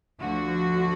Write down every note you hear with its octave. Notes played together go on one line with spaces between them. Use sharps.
D2 D3 F3 F#4